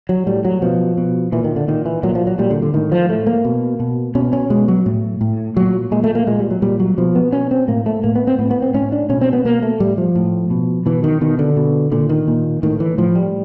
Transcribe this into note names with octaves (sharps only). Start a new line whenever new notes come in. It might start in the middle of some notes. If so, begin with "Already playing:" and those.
F#3
A2 G3
F#3
B2 F3
B2
A#2 E3
D#3
D3
A#2 D#3
E3
A#2 F#3
F3
F#3
A#2 G3
D3
D3
A2 D#3
F3
A2 A3
A#3
B2
B2
B2 C#4
C#4
B2 G#3
F#3
A2
A2
A#2 F#3
A#2 G#3
A3
A#3
A#2 G#3
G3
F#3
A#2 G3
F#3
B2 F3
B3
B2 C#4
C4
A2 A#3
A3
A2 A#3
B3
C4
A2 B3
B3
C4
A2 C#4
D4
B2 C#4
C4
B3
B2 A#3
A3
A2 G3
F3
A2
B2
B2 E3
D#3
B2 D#3
D3
B2
A#2 D3
D#3
A#2
A2 D#3
E3
A2 F3
G3